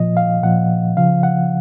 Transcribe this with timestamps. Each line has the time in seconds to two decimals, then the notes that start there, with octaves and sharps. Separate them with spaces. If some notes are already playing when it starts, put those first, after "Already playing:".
Already playing: A#2 F3 D#5
0.17 F5
0.43 A#2 F3 F#5
0.97 C#3 F3 F5
1.23 F#5